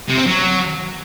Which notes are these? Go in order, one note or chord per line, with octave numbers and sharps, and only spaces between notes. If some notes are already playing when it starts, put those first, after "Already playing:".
C3
C4
F#3